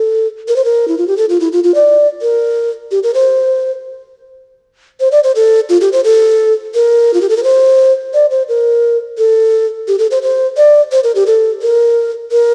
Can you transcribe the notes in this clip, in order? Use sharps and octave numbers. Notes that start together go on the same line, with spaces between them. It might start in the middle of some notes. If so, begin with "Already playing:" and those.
Already playing: A4
A#4
C5
A#4
E4
F4
G4
A4
F4
E4
F4
F4
D5
A#4
G4
A#4
C5
C5
D5
C5
A4
F4
G4
C5
A4
A#4
F4
G4
A4
A#4
C5
D5
C5
A#4
A4
G4
A4
C5
C5
D5
C5
A#4
G4
A4
A#4
A#4